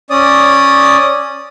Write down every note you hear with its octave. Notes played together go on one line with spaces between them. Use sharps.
C#4 D5 D#6